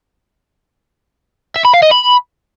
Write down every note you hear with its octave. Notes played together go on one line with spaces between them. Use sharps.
E5
B5
F5
D#5
B5